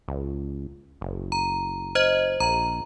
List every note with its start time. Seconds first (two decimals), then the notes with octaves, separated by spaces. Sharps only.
0.08 C#2
1.01 F#1
1.32 A#5
1.95 C5 D#5
2.40 A#1 A#5